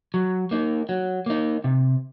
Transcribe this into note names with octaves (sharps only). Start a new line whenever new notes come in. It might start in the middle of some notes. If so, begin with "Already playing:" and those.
F#3
A#3 D#4
F#3
A#3 D#4
C3